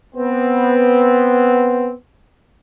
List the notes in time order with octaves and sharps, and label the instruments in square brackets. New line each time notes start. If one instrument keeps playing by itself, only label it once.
[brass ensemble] B3 C4